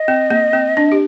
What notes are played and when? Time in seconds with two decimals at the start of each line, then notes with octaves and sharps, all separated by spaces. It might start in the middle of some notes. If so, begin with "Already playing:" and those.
Already playing: D#5
0.08 C4
0.30 A#3
0.53 C4
0.77 D4
0.92 G4